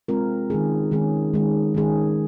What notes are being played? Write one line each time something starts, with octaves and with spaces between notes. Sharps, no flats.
G#3 C4 F4 A#4
D#3 G#3 C#4 G#4
D#3 G#3 C#4 G#4
D#3 G#3 C#4 G#4
D#3 G#3 C#4 G#4